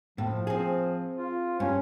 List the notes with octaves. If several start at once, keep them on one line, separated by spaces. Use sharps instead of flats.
A2 F3
C4 G#4
F4
G2 C#4